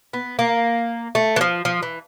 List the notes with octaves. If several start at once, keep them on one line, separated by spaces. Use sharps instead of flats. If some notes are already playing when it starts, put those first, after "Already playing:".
B3
A#3
A3
E3
F3
F3
E3